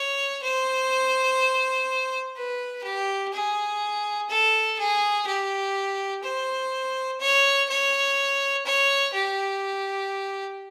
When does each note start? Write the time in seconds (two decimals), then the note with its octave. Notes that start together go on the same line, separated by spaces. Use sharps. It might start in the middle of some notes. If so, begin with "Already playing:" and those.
Already playing: C#5
0.42 C5
2.36 B4
2.83 G4
3.33 G#4
4.29 A4
4.78 G#4
5.26 G4
6.23 C5
7.20 C#5
7.69 C#5
8.65 C#5
9.13 G4